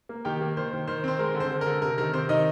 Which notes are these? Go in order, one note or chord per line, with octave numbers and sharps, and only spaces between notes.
A#3
D#3 G4 G5
A#3
D#3 C5
D#3
D#3 C5
C4 C5
G#3 A#4
D3
C5
D3
A#4
D3
C3 A#4
D#3 A#4
C3 C5
D#3 D#4 D#5